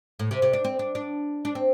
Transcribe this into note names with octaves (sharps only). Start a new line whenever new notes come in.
A2
C3
C3
D4
C4
D4
D4
D4
C4